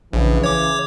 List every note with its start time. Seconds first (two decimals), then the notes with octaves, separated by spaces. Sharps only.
0.13 A#1 C#3 E3
0.43 C#5 D6